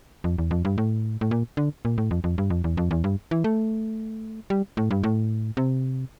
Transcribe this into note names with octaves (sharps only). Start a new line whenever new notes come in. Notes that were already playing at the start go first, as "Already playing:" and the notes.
F2
E2
F2
G2
A2
A2
A#2
D3
A#2
A2
F2
F2
G2
F2
E2
F2
E2
G2
E3
A3
G3
A2
G2
A2
C3